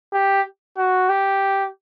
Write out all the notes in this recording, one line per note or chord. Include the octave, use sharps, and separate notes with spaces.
G4
F#4
G4